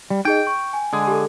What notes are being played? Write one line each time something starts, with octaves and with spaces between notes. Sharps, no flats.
G3
D#4 G#4 D#5 G5
C#6
G#5
D3 G#3 G#4
G4 A4